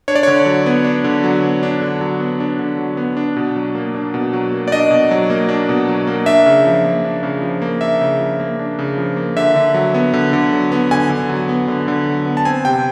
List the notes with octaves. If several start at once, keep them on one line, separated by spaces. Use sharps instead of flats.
D4 C#5
D5
D3 C#5
F#3
B3
D4
D3
F#3
B3
D4
D3
F#3
B3
D4
D3
F#3
B3
D4
B2
F#3
A#3
D4
B2
F#3
A#3
D5
D4 D#5
B2
F#3
A#3
D4
B2
F#3
A#3
D4 E5
C#3
F3
A#3
D4
C#3
F3
A#3
D4 E5
C#3
F3
A#3
D4
C#3
F3
A#3
D3 E5
D3
F#3
B3
D3
D3
F#3
B3
D3 G#5
D3
F#3
B3
D3
D3
F#3
B3
A5
C4 G#5
C3 G5